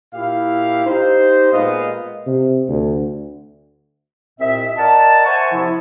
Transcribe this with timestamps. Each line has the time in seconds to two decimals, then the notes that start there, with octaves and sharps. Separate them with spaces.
0.14 A#2 E4 G4 F5
0.86 D#4 G4 C5
1.53 A#2 G#3 B3 D#5 F5
2.27 C3
2.68 D2
4.40 C2 A#2 C4 D#5 E5
4.78 A#4 D5 D#5 F#5 A5
5.26 C5 E5 F#5 G#5 A5 C#6
5.53 C3 F3 E4